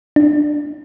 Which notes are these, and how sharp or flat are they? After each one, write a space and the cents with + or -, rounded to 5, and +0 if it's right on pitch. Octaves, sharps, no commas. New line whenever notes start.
D4 +5